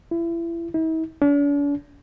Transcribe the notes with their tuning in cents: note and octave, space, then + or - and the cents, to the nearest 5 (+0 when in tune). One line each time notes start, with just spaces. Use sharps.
E4 +30
E4 -45
D4 -45